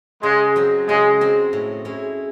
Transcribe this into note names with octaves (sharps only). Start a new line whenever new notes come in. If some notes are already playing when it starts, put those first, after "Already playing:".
C#3 G#3
F#3 C4
C#3 G#3
F#3 C4
A2
G#3 C#4 E4